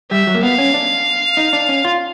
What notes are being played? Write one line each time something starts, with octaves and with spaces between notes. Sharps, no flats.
G3 E5
F#3
A#3
B3 F5
C#4
D4
D#4
D4
C#4
F4